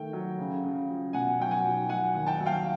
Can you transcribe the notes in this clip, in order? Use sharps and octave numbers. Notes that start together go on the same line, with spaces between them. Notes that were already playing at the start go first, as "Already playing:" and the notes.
Already playing: D#3 A3 G5
F#3
C#3
C#3
F3
B2 F#5 G#5
F#3 G5
F#5 G#5
B1
F#3 F#5 G#5
D#2
G5 A5
F#3
F5 G5